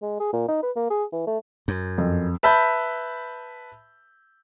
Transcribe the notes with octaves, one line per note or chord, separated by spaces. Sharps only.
G#3
G#4
A#2
D#4
B4
A#3
G#4
E3
A3
F#2
F2
B4 E5 A5 B5 G6